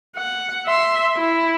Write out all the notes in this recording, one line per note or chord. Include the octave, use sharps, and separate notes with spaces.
F#5
E5 C6
E4